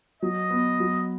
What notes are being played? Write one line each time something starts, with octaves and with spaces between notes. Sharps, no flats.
F#3 D#5
B3
F#3